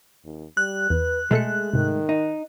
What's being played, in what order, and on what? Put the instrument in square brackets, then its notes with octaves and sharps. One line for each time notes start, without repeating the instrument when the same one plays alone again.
[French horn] D#2
[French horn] G3 [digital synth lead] F#6
[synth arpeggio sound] E2 [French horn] B4
[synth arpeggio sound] B2 A4 C#7 [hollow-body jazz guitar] G#3 A3 [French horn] G#4
[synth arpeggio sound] G#2 C3 [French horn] D#3
[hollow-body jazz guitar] D#4